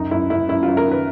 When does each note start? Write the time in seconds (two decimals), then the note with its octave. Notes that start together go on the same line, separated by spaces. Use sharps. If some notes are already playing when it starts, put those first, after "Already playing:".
Already playing: C#2 F#2 D#4
0.11 F#2 E4
0.30 F#2 E4
0.49 F#2 E4
0.63 F4
0.68 F#2
0.77 A#4
0.86 D#3
0.91 B4